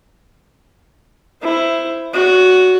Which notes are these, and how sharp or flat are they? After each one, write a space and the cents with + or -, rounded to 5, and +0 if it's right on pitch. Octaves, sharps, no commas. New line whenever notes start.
E4 +10 C5 +0
F#4 +0 C#5 +45